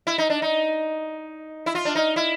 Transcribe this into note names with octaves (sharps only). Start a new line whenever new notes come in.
E4
D#4
D4
D#4
E4
F4
D4
D#4
E4